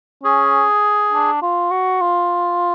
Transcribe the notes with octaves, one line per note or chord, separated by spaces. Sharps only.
C#4 G#4
D4
F4
F#4
F4